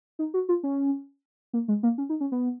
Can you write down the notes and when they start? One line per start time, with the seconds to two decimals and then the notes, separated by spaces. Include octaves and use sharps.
0.19 D#4
0.34 F#4
0.49 F4
0.63 C#4
1.53 A#3
1.68 G#3
1.83 A#3
1.98 C#4
2.09 D#4
2.21 C#4
2.32 B3